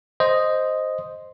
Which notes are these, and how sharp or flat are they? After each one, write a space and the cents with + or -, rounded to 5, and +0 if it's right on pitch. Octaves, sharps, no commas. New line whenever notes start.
C5 +0 D#5 +0